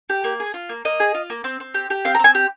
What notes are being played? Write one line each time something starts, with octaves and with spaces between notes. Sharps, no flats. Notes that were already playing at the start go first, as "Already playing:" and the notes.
G4
A#3
G#4
F4
A#3
A#3 D#5
G#4
F4
A#3
C4
C4
G4
G4
C4 F5
A#5
C4 G#5
G4